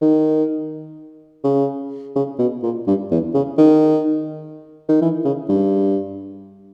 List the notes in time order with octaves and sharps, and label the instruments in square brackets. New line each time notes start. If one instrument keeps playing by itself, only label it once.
[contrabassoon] D#3
C#3
C#3
B2
A#2
G2
E2
C#3
D#3
D#3
E3
C#3
G2